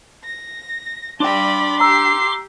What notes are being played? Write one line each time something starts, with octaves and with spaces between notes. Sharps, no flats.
A#6
D4 D5 G5 B5 C6 D6
G4 A#5 E6 C7